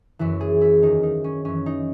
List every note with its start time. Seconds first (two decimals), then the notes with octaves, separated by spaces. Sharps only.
0.19 F#2 E3 E4
0.40 G#4
0.61 E4
0.82 E2 D#3 D#4
1.03 D#4
1.24 C#4
1.45 F#2 E3 C#4
1.66 D#4